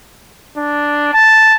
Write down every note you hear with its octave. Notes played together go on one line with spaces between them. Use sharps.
D4
A5